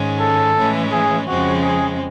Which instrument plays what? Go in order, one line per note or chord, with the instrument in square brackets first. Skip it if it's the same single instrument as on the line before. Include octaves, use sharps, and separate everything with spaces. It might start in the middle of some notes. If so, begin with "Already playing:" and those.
Already playing: [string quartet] G#2 D#3 G#3 C#4
[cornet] A4
[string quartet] A2 E3 G#3 C#4
[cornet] G#4
[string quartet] F2 C#3 F3 G#3 C4 [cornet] F#4
[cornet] G#4